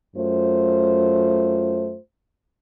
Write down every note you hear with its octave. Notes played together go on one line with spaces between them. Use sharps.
F#2 A3 F4 C5